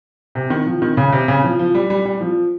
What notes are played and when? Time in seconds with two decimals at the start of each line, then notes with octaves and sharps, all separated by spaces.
0.35 C3
0.50 D#3
0.66 F3
0.82 D#3
0.97 C#3
1.12 C3
1.28 C#3
1.44 F3
1.59 F3
1.75 G3
1.90 G3
2.05 G3
2.21 F3